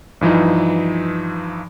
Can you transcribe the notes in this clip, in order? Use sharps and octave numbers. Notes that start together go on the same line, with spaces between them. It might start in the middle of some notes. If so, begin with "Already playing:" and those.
G2 E3 F3 D#4